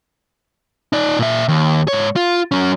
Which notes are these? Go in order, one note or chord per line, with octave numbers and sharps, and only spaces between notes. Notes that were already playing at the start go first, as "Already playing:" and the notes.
D#4 D5
A#2 E5
D#2
G#2 C#5
F4
F#3 C#4